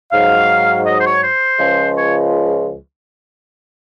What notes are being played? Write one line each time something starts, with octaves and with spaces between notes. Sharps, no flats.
G#2 F#3 F5
D#5
C5
C#5
C5
C#2 C#3 F3 G#3
C#5